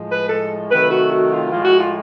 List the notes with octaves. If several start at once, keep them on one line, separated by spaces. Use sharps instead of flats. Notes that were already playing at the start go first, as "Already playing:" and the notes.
Already playing: A2 F3 G#3
B4
A4
C3 D#3 F#3 A3 B4
F#4
F#4
F4
A2 F3 G#3 F4
F#4
F4